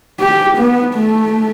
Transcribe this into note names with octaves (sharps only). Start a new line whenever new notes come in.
G4
B3
A3